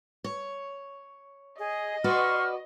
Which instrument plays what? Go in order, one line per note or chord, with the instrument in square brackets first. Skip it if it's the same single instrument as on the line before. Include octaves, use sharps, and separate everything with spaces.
[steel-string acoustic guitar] C#5
[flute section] G#4 [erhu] D#5
[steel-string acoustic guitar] F#4 B4 D5 [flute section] C6 C#6 [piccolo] F6